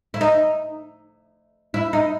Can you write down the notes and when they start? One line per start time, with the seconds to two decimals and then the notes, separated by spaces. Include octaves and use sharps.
0.14 E4
0.21 D#4
1.74 E4
1.93 D#4